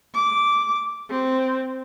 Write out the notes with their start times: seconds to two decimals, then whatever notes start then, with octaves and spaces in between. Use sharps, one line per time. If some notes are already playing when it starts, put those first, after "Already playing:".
0.14 D6
1.10 C4